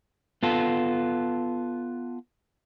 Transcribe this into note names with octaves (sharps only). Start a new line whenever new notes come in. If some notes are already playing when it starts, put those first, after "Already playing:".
B3 F4 A4